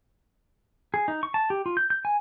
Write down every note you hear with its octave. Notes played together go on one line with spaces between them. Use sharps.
G#4
D#4
C#6
A5
G4
F4
G6
G6
G#5